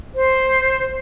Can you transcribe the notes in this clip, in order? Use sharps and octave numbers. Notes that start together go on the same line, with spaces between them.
C5